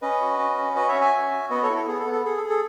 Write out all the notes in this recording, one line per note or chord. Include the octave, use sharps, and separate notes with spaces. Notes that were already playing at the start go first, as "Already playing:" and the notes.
C#4 B4 D#5
F#4
C#4
C#4
F#4 B4 D#5
C#5 E5
C#4
E5 G#5
F#4
F#4
B3 B4 D#5
A4 C#5
E4
A4
B3 G#4
A4
B3
A4
G#4 A4
A4
G#4
A4